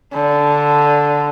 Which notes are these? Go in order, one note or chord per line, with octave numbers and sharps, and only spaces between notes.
D3